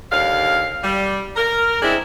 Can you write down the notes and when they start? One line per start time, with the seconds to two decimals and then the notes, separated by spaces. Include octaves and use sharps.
0.11 D#2 D3 F5
0.83 G3
1.36 A#4
1.82 G#3 C4 D4 E4 G#4